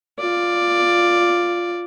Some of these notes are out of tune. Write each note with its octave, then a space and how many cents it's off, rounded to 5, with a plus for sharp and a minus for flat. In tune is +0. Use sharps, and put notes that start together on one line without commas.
F4 +0 D5 +5